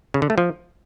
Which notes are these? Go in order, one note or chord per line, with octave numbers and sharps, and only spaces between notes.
C#3
D3
A3
F3